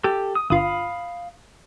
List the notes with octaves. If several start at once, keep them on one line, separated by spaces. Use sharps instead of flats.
G4 A4
D#6
G1 F4 F5 B5 D#6